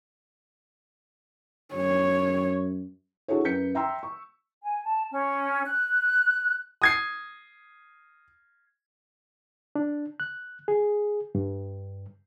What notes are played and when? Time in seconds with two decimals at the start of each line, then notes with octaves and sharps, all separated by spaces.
1.74 F#2 C#5
3.28 D4 E4 F#4 G#4 A4 C#5
3.44 F#2 B4 G6 B6 C#7
3.75 E5 G5 A#5 C6 E6
4.03 C#6
4.62 G#5
4.85 A5
5.11 C#4
5.66 F#6
6.82 D#6 G#6 C7
9.75 D4
10.20 F#6
10.68 G#4
11.35 G2